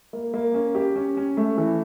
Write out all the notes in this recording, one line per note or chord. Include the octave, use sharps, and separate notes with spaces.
A#3
A#3
C#4
G4
C#4
C#4
A3
E3